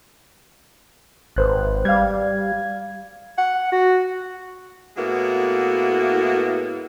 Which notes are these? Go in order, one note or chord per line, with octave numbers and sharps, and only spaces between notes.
G#1 B4 C5 F#6
G3 F5 G#6
F#5
F#4
A2 G#3 A#3 B3 E4 F#4